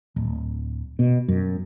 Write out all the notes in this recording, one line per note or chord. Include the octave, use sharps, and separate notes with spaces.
D1
B2
F#2